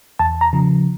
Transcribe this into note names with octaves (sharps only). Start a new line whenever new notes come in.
E2 A5
A#5
C#3 F3